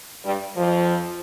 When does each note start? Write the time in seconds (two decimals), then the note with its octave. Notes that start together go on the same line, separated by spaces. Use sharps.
0.24 G2 G3
0.57 F2 F3